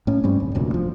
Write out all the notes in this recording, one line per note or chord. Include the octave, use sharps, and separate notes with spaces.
A2 C#4
G2 G3 C4 C#4
D1
F1 D2 A#2
F3